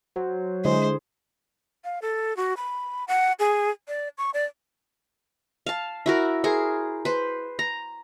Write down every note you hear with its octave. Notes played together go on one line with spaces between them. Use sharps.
F#3 C5
D3 G#3 E4 G#4 C5
F5
A4
F#4
B5
F#5
G#4
D5
C#6
D5
F5 A5
E4 F#4 A#4
G#4 A#4 C5
B4 C5
A#5